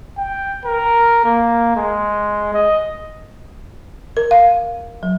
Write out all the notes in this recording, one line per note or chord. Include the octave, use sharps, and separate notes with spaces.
G5
A#4
A#3
G#3
D#5
A#4
F5
F#3